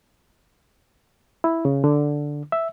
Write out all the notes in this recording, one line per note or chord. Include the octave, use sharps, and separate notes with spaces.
E4
C#3
D3
E5